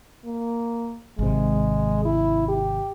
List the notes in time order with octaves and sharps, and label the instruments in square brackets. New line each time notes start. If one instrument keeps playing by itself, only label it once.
[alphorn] A#3
[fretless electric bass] G#1 C3 [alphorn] G#3
[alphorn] E4
G4